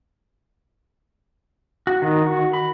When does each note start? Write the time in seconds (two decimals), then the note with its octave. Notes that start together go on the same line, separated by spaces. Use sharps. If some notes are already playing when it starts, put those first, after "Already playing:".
1.87 F#4
2.02 D#3
2.26 F#4
2.53 B5